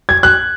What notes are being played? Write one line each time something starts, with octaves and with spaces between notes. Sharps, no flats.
G#6
F#6